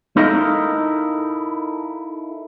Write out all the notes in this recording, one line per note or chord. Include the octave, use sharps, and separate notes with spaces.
D#4 E4 A4 A#4 D#5 F5